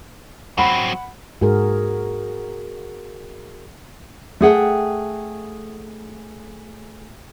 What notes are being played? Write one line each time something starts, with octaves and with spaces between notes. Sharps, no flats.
F#3 C4 F#5 B5
G#2 F#4 G#4 A#4
A3 G#4 F#5 G5